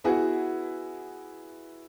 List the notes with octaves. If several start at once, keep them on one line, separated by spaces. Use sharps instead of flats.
B3 E4 F#4 G#4 B4 F#5